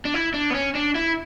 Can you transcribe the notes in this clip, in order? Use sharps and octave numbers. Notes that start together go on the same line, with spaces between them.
D4
E4
D4
B3
C#4
D4
E4